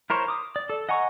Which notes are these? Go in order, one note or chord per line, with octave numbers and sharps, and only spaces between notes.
E4 A#4 C5 C#5
D6 D#6
D5
A4
D#5 F#5 G#5 A#5 C#6